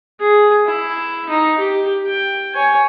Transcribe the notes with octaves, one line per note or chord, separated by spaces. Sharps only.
G#4
E4
D#4
G4
G5
C#5 G#5